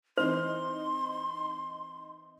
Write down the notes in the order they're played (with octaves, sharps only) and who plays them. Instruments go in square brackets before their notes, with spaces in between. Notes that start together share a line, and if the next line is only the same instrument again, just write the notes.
[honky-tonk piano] E3 C4 D#4 [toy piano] C5 [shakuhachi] C6